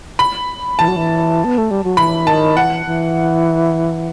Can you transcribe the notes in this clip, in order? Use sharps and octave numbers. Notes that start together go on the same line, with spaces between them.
B5
E3 A5
F#3
E3
B3
A3
G3
F#3
E3 B5
D#3 A5
E3 F#5
E3